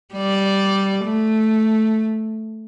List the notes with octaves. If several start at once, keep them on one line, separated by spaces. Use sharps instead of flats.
G3 D5
A3